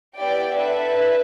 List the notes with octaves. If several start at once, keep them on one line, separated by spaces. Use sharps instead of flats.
B3 E4 G4 D5 G5
D4 A4 B4 E5